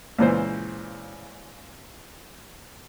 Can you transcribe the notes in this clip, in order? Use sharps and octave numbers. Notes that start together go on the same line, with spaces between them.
C#2 A#2 E3 C5